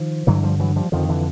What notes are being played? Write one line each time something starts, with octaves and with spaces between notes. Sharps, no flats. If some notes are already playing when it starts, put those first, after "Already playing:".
Already playing: D#3 F3
G2 D3 E3 F#3
F3 G3
E3 F#3
F3 G3
F2 D3 D#3 F3
D3 E3